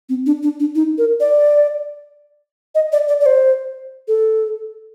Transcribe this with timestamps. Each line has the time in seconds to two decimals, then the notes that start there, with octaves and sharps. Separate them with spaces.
0.09 C4
0.26 D4
0.43 D4
0.60 D4
0.75 D#4
0.98 A#4
1.20 D5
2.75 D#5
2.92 D5
3.08 D5
3.21 D5
3.26 C5
4.08 A4